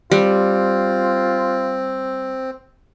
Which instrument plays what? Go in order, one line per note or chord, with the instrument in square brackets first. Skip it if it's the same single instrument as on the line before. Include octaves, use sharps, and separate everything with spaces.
[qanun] G3 [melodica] C4 [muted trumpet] F4